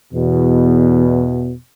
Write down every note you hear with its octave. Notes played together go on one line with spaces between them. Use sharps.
E2 B2